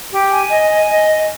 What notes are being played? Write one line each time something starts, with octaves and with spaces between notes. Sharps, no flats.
G4
G#5
D#5
G#5
D#5
G#5